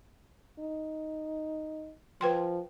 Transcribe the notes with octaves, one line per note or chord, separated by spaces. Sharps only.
D#4
F3 B4 G5 C6